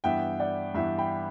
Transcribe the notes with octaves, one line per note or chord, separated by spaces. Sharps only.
G2 E3 B3 E5 G5
D5 F#5
G2 E3 B3 E5
G5 B5